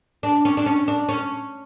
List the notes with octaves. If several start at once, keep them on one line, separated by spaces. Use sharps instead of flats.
D4
C#4
D4
C#4
D4
C#4